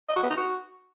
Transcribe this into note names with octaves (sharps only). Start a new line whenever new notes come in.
D#5
F#4
B3
D#4
F#4